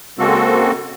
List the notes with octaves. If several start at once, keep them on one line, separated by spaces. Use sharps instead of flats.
C#3 G#3 A#3 C4 F#4 A4